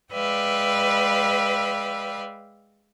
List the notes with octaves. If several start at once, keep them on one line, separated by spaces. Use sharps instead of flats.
G#3 B4 D5 E5 F5 G5